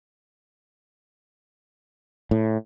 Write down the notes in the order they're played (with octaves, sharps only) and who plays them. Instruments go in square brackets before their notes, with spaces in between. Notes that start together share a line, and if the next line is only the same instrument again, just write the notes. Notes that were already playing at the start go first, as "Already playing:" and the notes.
[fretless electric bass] A2